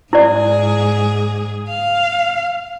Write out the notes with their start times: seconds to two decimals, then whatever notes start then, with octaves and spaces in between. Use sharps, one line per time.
0.13 G#2 E4 G#4 D5
1.70 F5